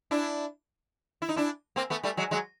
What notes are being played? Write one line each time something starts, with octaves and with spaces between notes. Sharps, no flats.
D4 E4
E4
D#4
D4 E4
A#3 C4
A3 B3
G3 A3
F#3 G#3
F#3 G#3